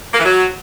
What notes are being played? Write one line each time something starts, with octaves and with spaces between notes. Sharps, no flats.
A#3
E3
F#3